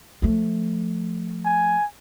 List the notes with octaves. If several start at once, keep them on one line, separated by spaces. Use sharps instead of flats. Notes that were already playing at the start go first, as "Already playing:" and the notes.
F3 A3
G#5